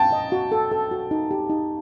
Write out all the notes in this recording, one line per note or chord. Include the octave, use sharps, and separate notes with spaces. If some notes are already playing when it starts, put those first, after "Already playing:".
Already playing: G5 A5
D#5
F#4
A4
A4
F#4
D#4
G4
D#4